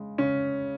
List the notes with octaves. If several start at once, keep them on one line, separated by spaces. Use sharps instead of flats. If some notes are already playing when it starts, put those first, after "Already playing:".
Already playing: C#3 G#3
C#3 C#4